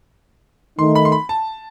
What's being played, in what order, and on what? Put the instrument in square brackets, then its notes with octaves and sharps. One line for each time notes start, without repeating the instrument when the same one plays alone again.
[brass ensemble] D#3 A3 D#4 [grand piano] C6
[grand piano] B5
C6
B5
A5